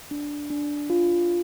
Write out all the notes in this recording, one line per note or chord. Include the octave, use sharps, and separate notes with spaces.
D4
D4
F4